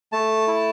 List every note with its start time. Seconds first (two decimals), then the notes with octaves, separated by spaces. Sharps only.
0.12 A3 A5
0.47 E4